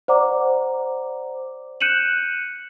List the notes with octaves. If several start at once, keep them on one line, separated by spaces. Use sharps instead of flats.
C5 D5 F#5 A#5 D6
F#6 G6 C#7 D#7 E7 F#7